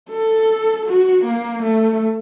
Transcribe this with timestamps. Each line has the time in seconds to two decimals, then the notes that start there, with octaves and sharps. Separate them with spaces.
0.10 A4
0.86 F#4
1.25 A#3
1.63 A3